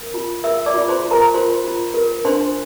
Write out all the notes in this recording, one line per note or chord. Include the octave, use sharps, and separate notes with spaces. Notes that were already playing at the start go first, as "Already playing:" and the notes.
Already playing: A#4
F4
A#4 E5 E6
D5 D6
F4
C5 C6
F4
A#4 A#5
F4 C5 C6
F4
A#4
D4 C5 C6